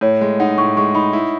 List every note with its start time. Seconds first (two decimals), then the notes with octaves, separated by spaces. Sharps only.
0.01 A2 C#5
0.21 G#3
0.40 D#4 F#5
0.58 A2 C#6
0.77 G#3 C#6
0.95 D#4 B5
1.13 E4